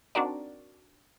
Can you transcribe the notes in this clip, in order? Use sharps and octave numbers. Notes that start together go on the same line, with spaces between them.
C4 D4 D#4 F#4 A#4 D5